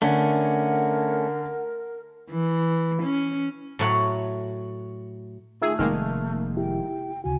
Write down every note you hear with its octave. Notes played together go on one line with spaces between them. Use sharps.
D3 A3 C#4 A#4 F#5
E3
C#4
A2 F#3 A3 C#5 F#5
D#3 A3 F4 G#4 E5 E6
F1 D#3 G#3 A#3 F6
E4 G4 G5
D2 C#3 F#4 G#5